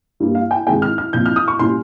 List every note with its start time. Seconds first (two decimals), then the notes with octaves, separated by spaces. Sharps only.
0.20 G2 G3 A#3
0.35 F5
0.51 G5
0.67 G#2 D#3 G#3 C4 G5
0.82 F6
0.98 F6
1.13 A#2 F3 C4 G6
1.26 F6
1.36 D#6
1.48 C#6
1.59 A#2 G3 C#4 C6